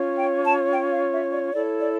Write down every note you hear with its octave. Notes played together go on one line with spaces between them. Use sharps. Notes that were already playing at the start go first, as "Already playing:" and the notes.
Already playing: C#4 F4 C#5
G5
A5
G5
F5
E5
D5
E4 A4 C#5 D5
D5